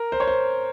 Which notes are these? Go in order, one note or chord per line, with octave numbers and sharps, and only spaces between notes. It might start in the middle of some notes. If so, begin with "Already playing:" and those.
Already playing: A#4
C5
C#5
C5